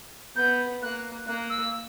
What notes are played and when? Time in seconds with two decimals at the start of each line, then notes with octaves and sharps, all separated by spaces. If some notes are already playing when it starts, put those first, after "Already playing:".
0.35 B3 G6
0.82 A#3 F#6
1.27 A#3 F#6
1.49 E6